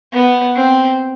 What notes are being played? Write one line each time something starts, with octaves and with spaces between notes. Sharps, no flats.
B3
C4